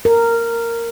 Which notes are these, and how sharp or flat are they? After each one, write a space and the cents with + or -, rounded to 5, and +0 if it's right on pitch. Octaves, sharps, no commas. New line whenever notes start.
A#4 -10